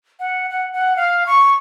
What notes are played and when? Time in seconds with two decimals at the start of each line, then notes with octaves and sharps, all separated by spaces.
0.20 F#5
0.50 F#5
0.73 F#5
0.97 F5
1.26 C#6